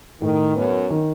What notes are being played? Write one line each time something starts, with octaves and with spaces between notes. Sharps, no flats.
A2 D#3
F#2 B3
D#3